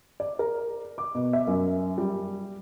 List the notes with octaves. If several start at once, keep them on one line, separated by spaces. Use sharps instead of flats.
D5
A#4
D6
B2
E5
F#2
G3